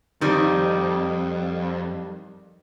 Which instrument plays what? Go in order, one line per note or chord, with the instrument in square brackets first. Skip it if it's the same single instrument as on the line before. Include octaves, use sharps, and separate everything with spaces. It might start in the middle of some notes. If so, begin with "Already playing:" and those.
[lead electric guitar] F2 [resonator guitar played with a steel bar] D#3 G3